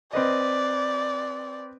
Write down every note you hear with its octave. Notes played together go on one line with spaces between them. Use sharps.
C4 B4 D5 D#5